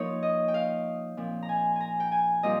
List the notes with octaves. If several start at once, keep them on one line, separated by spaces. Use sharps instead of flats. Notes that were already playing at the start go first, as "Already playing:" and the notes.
Already playing: F3 A#3 D#4 A#4 C#5
D#5
G5
F5
A#2 F3 C4
A#5
G#5
G#5 A#5
G5
G#5
A#2 G3 C4 F4 D#5